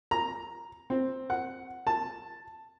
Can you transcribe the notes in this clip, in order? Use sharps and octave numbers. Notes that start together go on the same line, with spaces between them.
A#5
C4
F#5
A5